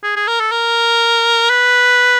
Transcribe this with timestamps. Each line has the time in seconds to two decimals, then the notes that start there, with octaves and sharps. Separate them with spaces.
0.03 G#4
0.16 G#4
0.28 A#4
0.40 A4
0.52 A#4
1.50 B4